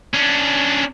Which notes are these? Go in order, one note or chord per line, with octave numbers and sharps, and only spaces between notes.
C#4 D4